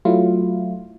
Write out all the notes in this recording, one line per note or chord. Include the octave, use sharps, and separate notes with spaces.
F#3 A3 E4 F4